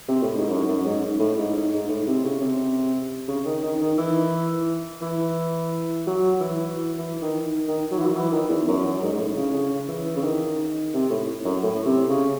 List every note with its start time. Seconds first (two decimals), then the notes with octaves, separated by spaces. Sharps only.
0.09 C3
0.22 A2
0.37 G#2
0.49 F#2
0.68 F#2
0.85 G#2
1.19 A2
1.37 G#2
1.54 G#2
1.72 G#2
1.89 A2
2.07 C3
2.24 C#3
2.41 C3
3.28 C#3
3.45 D#3
3.63 D#3
3.81 D#3
3.98 E3
5.01 E3
6.07 F#3
6.40 E3
6.98 E3
7.21 D#3
7.68 D#3
7.91 F#3
7.99 E3
8.07 F#3
8.15 E3
8.32 D#3
8.49 E2
8.68 F#2
8.85 F#2
9.02 G#2
9.12 G#2
9.19 A2
9.36 C#3
9.54 C#3
9.88 E3
10.16 C#3
10.23 D#3
10.93 C3
11.10 A2
11.45 F#2
11.63 A2
11.85 C3
12.09 C#3